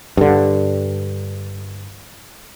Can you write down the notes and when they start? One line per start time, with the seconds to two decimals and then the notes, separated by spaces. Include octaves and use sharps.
0.17 G2 D3